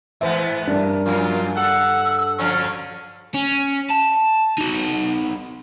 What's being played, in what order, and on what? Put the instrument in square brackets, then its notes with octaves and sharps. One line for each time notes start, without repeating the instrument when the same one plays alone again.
[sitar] G#2 E3 B3 [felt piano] C5 E5
[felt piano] G2 D4 [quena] A#4
[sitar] F2 F#3 [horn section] A#3 F4
[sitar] A4 [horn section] F#5 [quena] E6
[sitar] D3 F3 F#3 [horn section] C#4 [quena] F6
[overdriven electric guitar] C#4
A5
D#4 F#4